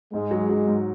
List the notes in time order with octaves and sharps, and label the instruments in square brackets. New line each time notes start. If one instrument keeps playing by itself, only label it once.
[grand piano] G#2 [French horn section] G#3
[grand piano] F#3
F#3
G#2